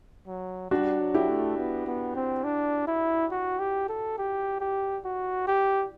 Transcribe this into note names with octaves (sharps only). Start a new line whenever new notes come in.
F#3
G3 D4 F#4
F#3
E4 G4
A3
B3
B3
C4
D4
E4
F#4
G4
A4
G4
G4
F#4
G4